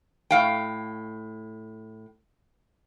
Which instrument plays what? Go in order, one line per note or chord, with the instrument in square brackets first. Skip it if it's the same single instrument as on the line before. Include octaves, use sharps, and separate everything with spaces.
[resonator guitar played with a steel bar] A2 F5 G5